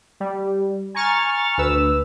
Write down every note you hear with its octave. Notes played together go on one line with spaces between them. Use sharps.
G3
G#5 A#5 C#6 F6 A6
D2 B4 E6